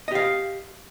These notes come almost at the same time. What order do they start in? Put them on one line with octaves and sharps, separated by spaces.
D#5 G4 F5